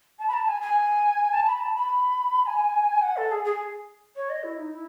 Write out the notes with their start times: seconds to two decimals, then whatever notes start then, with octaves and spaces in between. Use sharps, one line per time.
0.19 A5
0.28 B5
0.34 A5
0.48 G#5
0.61 G#5
1.33 A5
1.46 B5
1.61 A5
1.75 B5
2.46 G#5
3.02 F#5
3.17 A4
3.31 G#4
3.45 G#4
4.16 C#5
4.30 D#5
4.43 E4
4.58 D#4
4.73 E4